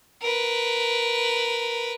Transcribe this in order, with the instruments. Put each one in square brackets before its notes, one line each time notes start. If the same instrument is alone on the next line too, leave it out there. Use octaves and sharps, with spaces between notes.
[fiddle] A#4 B4